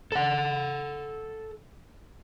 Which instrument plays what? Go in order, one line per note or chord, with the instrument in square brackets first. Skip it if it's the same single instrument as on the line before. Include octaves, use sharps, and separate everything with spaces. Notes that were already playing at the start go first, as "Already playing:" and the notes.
[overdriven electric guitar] A4 F#5